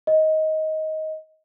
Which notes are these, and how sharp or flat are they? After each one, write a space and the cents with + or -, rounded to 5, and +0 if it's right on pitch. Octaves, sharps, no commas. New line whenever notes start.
D#5 +15